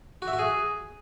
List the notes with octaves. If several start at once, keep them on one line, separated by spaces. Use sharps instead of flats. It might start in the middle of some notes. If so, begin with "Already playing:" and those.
F#4
E5
F#4
G#4